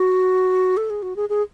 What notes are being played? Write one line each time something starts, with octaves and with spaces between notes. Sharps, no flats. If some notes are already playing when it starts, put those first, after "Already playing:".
Already playing: F#4
A4
G#4
F#4
G#4
G#4